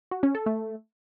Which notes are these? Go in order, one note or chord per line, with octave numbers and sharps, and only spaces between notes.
F#4
C#4
A4
A3